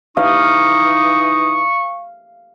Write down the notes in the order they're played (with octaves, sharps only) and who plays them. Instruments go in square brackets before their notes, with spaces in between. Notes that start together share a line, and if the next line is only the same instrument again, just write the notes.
[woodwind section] E3 D#4 D#6 [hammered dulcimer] F5 [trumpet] C#6